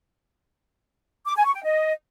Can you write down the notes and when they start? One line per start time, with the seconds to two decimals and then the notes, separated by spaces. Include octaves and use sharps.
1.28 D6
1.37 G#5
1.46 C#6
1.55 G5
1.65 D#5